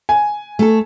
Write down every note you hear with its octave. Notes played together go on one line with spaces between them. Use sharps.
G#5
A3 A4